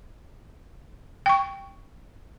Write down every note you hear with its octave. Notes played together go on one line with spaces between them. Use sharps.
G5 C#6